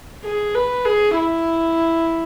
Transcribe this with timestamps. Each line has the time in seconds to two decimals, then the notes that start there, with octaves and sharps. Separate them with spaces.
0.24 G#4
0.55 B4
0.85 G#4
1.16 E4